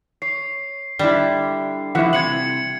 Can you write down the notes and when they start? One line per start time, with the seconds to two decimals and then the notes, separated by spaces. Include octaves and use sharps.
0.22 C#5 C7
0.99 D3 G3 D4 E4
1.95 E3 F3 A3 E4 F#5
2.13 C3 G#6 C#7 F#7